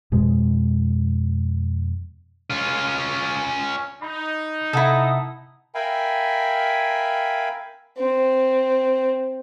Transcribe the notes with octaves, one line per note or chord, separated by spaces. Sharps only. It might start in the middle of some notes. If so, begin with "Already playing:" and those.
F2 B2 G#3
C#4 F4
D#4 B5
C3 E4 A4 F#5 A#5 D#6
A#4 E5 F5 G5 G#5 B5
C4